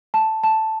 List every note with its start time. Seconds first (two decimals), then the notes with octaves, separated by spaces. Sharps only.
0.14 A5
0.44 A5